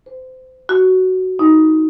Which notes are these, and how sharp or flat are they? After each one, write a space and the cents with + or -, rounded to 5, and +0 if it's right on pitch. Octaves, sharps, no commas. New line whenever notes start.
C5 -25
F#4 +10
D#4 +15